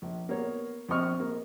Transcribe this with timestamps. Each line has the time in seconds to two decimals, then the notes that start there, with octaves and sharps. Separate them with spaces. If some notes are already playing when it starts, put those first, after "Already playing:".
0.02 A#1
0.29 A#3 B3 C#5
0.88 A#1 C4 D#5 C#6 F6
1.20 A#3